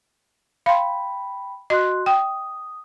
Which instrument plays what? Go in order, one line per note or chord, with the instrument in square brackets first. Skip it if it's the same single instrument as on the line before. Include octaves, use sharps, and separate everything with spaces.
[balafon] F5 C6 [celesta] G5 B5
[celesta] F#4 C6 F#6 [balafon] D#5
[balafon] G5 [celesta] D#6